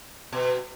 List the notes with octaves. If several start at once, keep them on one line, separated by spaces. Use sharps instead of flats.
B2